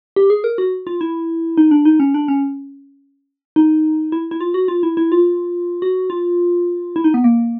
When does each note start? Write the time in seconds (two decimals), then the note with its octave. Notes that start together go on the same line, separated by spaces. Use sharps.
0.16 G4
0.30 G#4
0.44 A#4
0.58 F#4
0.87 F4
1.01 E4
1.57 D#4
1.71 D4
1.85 D#4
2.00 C#4
2.14 D4
2.28 C#4
3.56 D#4
4.12 E4
4.31 E4
4.41 F4
4.54 F#4
4.68 F4
4.83 E4
4.97 E4
5.12 F4
5.82 F#4
6.10 F4
6.96 E4
7.04 D#4
7.14 B3
7.24 A#3